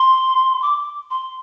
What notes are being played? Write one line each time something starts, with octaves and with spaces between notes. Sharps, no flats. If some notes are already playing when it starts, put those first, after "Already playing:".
Already playing: C6
D6
C6